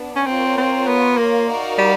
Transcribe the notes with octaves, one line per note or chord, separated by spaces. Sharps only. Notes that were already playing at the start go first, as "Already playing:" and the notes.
Already playing: B3 D4
C#4
C4 F4 A#4 C#5
C4
B3
A#3
D#4 F#4 A#4 D5 F5
G3